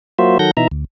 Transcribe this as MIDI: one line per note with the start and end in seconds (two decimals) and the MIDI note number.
0.19 0.38 54
0.19 0.38 58
0.19 0.38 65
0.19 0.38 66
0.19 0.38 72
0.19 0.38 76
0.39 0.51 51
0.39 0.51 54
0.39 0.51 69
0.39 0.51 78
0.39 0.51 91
0.39 0.51 94
0.57 0.67 47
0.57 0.67 52
0.57 0.67 63
0.57 0.67 76
0.57 0.67 82
0.71 0.85 38